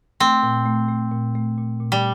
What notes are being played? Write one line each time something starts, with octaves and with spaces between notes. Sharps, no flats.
A3 C4
A#2
A3
A3
A#2
A3
A#2
A#2
G3